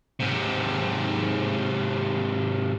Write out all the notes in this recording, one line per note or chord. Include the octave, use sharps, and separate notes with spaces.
G#2 C3